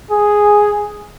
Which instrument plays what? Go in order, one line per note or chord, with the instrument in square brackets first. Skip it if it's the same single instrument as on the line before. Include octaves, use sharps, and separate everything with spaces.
[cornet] G#4